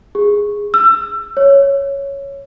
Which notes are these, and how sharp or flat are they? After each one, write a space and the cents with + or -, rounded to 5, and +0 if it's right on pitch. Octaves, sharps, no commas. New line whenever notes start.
G#4 -10
E6 +25
C#5 +0